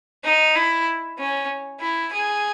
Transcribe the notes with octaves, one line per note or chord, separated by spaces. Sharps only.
D#4
E4
C#4
E4
G#4